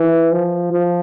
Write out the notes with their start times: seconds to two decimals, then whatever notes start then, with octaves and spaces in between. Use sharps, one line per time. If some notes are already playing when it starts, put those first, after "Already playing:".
Already playing: E3
0.32 F3
0.71 F3